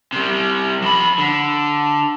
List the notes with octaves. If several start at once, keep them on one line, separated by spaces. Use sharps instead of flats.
C3 G3
F2 B5
D3